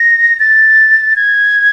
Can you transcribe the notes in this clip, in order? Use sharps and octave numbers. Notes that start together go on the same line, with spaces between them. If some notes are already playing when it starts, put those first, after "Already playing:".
Already playing: A#6
A6
G#6